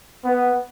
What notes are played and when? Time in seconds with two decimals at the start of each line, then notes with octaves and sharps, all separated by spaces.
0.25 B3